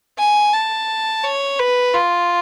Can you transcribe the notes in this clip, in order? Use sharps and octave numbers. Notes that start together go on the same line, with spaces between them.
G#5
A5
C#5
B4
F4